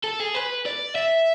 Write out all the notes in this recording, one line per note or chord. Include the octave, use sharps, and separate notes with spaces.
A4
G#4
B4
D5
E5